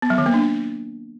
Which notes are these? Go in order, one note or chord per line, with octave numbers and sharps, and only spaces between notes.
B3
F#3
D#3
A#3
D4